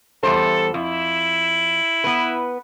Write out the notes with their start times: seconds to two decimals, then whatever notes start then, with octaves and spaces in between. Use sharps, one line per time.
0.23 E2 G3 A4 C5
0.74 F2 E4
2.04 B3 B4